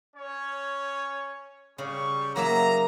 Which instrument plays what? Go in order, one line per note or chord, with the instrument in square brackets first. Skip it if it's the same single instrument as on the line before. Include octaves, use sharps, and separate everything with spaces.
[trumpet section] C#4 C#5
[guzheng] C#3 [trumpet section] G3 C#6
[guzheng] F#3 A#3 E5 [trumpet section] A#5